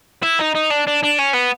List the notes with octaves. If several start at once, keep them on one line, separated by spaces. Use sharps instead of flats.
E4
D#4
D#4
D4
D4
D4
C#4
B3